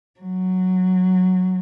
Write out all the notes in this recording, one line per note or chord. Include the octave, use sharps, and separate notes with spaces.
F#3